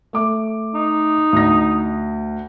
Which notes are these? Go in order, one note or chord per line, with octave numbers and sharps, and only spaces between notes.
A3 D6
D#4
D2 A#6